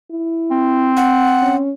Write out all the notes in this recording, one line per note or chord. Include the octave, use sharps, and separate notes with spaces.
E4
C4
F#5
C#4